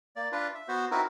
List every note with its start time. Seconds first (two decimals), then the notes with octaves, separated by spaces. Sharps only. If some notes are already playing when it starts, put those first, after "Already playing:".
0.16 A#3 D5
0.32 D4 F4 B4
0.55 E5
0.68 B3 F#4 C5
0.91 C4 D#4 E4 F#4 A#4 B4